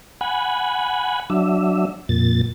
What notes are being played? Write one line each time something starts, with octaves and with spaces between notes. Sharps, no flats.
F#5 G#5 B5
F#3 D4 E5
F2 A#2 A6